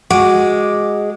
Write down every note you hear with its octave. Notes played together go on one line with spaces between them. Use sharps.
G#3 F#4 D6